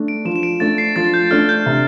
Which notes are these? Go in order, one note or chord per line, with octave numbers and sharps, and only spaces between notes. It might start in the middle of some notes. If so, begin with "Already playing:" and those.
Already playing: A3 D4
D7
F3 E7
E7
D7
A3 D4 A6
C7
F3 A6
G6
A3 D4 F6
G6
C3